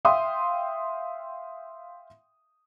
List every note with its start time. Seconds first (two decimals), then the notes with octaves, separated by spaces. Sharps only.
0.05 E5 F5 G5 C6 D#6